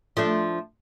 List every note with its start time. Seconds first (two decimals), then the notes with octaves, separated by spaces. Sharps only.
0.17 F3 A3 D4